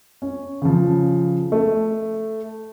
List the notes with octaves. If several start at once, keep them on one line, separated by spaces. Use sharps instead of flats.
C#4
C#3 F3
A3